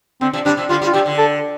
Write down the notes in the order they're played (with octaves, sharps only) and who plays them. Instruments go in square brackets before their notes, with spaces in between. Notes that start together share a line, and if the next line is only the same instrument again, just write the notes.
[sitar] D3 [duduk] C4
[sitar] C3 F3
[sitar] D3 G3 [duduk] D4
[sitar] C3 F3
[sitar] D3 G3 [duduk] F4
[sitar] D3 G3
[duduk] F4
[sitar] C3 F3 [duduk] G4
[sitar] D3
[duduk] A4